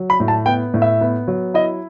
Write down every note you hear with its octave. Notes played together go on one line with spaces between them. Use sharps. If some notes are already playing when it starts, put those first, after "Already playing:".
Already playing: F#3
B5
A2
A5
B3 G5
A2
E5
B3
F#3
E4 D#5